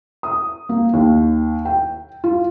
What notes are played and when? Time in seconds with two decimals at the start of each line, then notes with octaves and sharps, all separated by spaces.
0.23 D#6
0.69 A#3
0.93 D#2
1.65 G5
2.24 F4